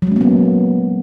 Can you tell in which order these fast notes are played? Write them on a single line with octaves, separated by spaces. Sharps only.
F#3 G#3 C#4 A#3 B3